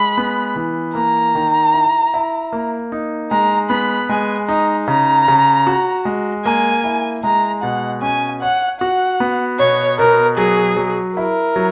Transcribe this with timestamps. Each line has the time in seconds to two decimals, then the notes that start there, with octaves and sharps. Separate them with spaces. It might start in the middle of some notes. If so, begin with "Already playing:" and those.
Already playing: G#3 B5
0.18 B3
0.56 E3
0.95 A#3 A#5
1.35 D#3
1.74 E4
2.14 E4
2.53 A#3
2.92 D#4
3.31 G#3 A#5
3.70 B3 B5
4.09 G#3 G#5
4.48 D#4 A#5
4.88 C#3 A#5
5.28 C#3
5.67 F#4
6.05 G#3
6.45 A#3 G#5
6.84 E4
7.24 G#3 A#5
7.63 B2 F#5
8.02 C#4 G#5
8.42 C#5 F#5
8.81 F#4 F#5
9.20 B3
9.59 B2 C#5
9.99 B2 A#4
10.37 F#3 G#4
10.77 F#3
11.17 E4 A#4
11.56 F#3